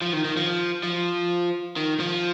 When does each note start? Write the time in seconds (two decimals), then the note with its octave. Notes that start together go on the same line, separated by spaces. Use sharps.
0.02 F3
0.13 D#3
0.25 D#3
0.37 F3
0.83 F3
1.76 D#3
2.00 F3